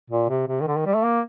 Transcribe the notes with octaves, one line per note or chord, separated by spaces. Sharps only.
A#2
C3
C3
D#3
D3
D#3
G3
A3
A#3